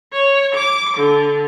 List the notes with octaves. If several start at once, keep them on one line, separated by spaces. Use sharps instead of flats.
C#5
D6
D3